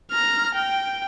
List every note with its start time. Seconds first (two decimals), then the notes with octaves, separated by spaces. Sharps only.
0.11 A#5 F6
0.55 G5